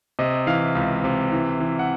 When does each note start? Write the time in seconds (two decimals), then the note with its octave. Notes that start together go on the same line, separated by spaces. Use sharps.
0.19 C3 D#5
0.47 E3 F5
0.75 C#2
1.04 C3
1.32 E3
1.60 E3
1.79 F#5